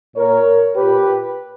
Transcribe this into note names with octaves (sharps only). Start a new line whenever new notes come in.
A#2 A#4 C#5
A#2 G4 B4